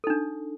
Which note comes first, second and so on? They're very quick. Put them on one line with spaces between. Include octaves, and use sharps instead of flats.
A4 D#4 D4